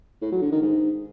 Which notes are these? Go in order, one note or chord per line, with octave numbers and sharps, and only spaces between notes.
A2
F#3
D3
D#3
G#2